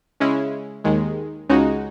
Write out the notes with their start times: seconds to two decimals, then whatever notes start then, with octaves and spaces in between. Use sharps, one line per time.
0.20 C#3 G#3 C#4 E4
0.84 D#2 D#3 G#3
1.49 C#2 C#3 G#3 D#4 F#4